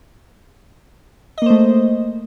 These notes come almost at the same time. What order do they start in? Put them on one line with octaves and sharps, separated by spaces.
D#5 A#3 C5 A3